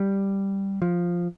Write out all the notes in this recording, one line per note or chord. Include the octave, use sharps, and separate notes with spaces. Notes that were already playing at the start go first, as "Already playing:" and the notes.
Already playing: G3
F3